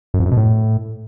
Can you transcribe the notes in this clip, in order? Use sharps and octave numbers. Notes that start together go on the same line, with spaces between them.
F#2
F2
F#2
B2
A2